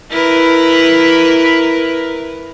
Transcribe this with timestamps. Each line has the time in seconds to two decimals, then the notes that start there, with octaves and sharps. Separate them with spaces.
0.11 E4 A#4 B4